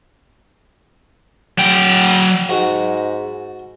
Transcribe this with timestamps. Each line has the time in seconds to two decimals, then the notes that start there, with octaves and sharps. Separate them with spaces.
1.58 F#3 G5
2.49 G#2 F#4